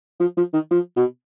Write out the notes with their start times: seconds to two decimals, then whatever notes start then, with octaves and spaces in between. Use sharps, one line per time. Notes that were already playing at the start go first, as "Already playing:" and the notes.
0.20 F3
0.37 F3
0.54 D#3
0.71 F3
0.96 B2